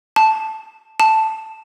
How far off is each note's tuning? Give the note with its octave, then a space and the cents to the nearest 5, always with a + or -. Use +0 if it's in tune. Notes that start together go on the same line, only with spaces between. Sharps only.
A5 -5
A5 +0